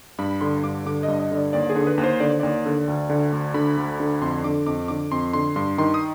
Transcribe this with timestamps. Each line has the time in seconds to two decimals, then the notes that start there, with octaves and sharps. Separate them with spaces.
0.19 G2 B5
0.41 D3 C6
0.64 G2 D6
0.86 D3 D6
1.03 D#5
1.08 G2
1.19 D#5
1.31 D3
1.37 D5
1.53 D#2 D5
1.69 G#4
1.75 D3
1.87 B4
1.98 D#2
2.04 C5
2.20 D3 D5
2.30 C5
2.40 D#2 D5
2.66 D3
2.88 D2
3.09 D3
3.32 D2
3.54 D3 B5
3.77 D2
4.00 D3
4.21 F2 C6
4.44 D3 D6
4.66 F2 D6
4.88 D3 D6
5.11 F2 C6
5.33 D3 C6
5.56 G2 C6
5.78 D#3 C6
5.94 D#6